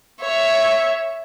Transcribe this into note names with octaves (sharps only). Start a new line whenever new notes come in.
C#5 E5